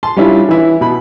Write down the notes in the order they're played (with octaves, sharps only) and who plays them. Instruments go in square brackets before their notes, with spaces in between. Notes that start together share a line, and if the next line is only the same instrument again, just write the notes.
[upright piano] A5 C6
G3 C#4 D4 E4 F4
E3 E4
B2 B5